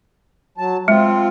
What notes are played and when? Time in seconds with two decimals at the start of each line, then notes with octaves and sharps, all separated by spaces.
0.58 F#3 A5
0.88 G#3 C4 F4